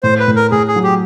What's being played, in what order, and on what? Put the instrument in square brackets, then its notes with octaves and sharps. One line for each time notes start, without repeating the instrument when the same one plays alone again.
[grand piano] A2 [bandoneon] C5
[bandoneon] B4
[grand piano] A2
[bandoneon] A#4
[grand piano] A2 [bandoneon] G#4
[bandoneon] G#4
[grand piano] F#3
[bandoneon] G4